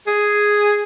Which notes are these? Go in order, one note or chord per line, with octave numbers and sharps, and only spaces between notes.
G#4